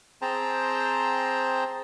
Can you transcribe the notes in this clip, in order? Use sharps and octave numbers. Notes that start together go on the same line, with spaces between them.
C4 G#4 C5 G5 A5 A#5